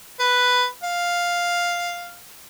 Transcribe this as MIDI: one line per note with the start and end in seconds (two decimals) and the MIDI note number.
0.20 0.66 71
0.84 2.19 77